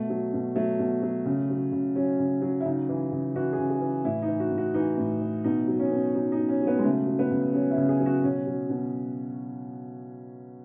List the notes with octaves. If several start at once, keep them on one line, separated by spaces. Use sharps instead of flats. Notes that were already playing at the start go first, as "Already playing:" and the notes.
Already playing: B2 A3
F#3
B2
F#3 A3
B2
F#3
C#3
F#3
C#3
F#3 C#4
C#3
F#3
E4
C#3 D#4
E3
C#3
E3 F#4
G#4
C#3
G#4
E3
A2 E4
D#4
E3
F#4
A2
F#4
E3 D#4
A2
E3
B2 D#4
F#3
C#4
B2
F#3 D#4
D#4
B2
C#4
F#3
B3
G#3
C#3 A3
F#3
B3
C#3
F#3 C#4
E4
C#3
G#4
F#3
F#4
B2 C#4
F#3
B2